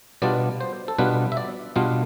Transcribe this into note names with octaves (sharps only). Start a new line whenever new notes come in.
B2 G3 B3 D4 F4 D5
C5
A4
B2 G3 B3 D4 F4 B4
E5
D5
B2 G3 B3 D4 F4 F5